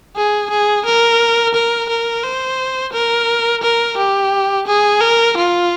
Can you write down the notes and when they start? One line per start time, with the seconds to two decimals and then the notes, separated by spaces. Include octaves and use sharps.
0.16 G#4
0.50 G#4
0.86 A#4
1.55 A#4
1.89 A#4
2.24 C5
2.93 A#4
3.63 A#4
3.97 G4
4.67 G#4
5.01 A#4
5.37 F4